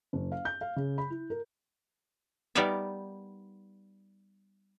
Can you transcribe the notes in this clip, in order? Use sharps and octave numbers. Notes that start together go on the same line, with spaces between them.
F#1
F5
G6
F5
C#3
B5
E4
A#4
G3 B3 D#4 A#4 D5 E5